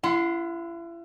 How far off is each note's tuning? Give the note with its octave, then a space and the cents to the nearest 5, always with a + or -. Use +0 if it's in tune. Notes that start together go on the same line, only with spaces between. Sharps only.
E4 +40 F#5 -20 C6 +0